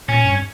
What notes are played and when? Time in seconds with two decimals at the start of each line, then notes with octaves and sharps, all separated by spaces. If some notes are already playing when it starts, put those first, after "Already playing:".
0.08 A#2 C#4
0.25 G2